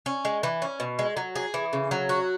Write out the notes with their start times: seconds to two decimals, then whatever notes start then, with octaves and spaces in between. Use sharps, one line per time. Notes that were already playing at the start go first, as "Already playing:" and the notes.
0.06 C#4
0.25 G#3
0.43 E3
0.62 C#4
0.80 B2
0.99 G#3
1.17 F#3
1.35 G#4
1.54 E3
1.73 C#3
1.91 F#3
2.09 F#4